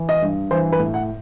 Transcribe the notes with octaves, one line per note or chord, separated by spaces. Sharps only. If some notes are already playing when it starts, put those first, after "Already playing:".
Already playing: E3
D#5
G2
E3 C5
B4
A2
F#5